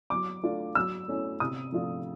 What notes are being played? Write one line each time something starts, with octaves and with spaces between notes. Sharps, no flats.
F#3 D6
A3 D4 F4
F#3 E6
A3 C#4 E4
C3 D#6
F3 A3 D4 F4